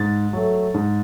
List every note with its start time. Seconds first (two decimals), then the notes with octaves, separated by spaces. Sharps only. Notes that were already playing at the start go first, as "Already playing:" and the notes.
Already playing: G#2 A6
0.33 F#3 A3
0.74 G#2